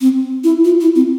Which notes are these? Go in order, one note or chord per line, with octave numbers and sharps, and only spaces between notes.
C4
E4
F4
E4
C4